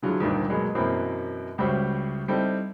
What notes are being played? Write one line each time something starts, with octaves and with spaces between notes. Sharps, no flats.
D3 E3 F#3 F4 G#4
D2 G2 A#2 D#3 F3 D4
B2 F#3 G#3 A#3
F#2 B2 E3 F#3 A#3 C4
C#2 G3 F#4 C5 E5
G3 C4 D#4 E4 A4